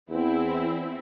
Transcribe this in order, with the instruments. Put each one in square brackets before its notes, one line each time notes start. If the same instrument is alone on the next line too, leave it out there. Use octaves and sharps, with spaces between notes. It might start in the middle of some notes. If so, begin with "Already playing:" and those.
[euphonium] E2 [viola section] C4 E4